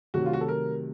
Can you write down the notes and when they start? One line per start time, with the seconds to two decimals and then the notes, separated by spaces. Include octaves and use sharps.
0.14 C3 D#3 F#3 A3 F#4
0.26 F4
0.33 F#4
0.41 A4
0.48 A#4